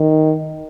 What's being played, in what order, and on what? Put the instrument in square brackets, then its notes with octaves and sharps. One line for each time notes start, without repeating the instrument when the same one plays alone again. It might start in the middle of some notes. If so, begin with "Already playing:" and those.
Already playing: [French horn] D#3